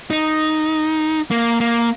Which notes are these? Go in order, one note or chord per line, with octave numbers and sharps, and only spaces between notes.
D#4
A#3
A#3